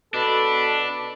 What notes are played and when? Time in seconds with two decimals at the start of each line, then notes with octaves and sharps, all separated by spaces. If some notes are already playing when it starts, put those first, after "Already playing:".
0.14 B2 D4 A4 B5